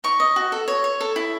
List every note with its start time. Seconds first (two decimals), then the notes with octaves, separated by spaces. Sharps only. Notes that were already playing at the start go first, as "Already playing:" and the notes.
0.04 D#4 C#6
0.20 D#5
0.36 F#4
0.52 A4
0.68 C#5
0.84 C#5
1.01 A4
1.16 E4